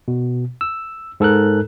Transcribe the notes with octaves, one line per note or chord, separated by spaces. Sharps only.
B2
E6
G#2 A4 A#4 F#6